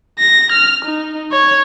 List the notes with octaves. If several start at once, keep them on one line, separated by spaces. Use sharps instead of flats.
A#6
F6
D#4
C#5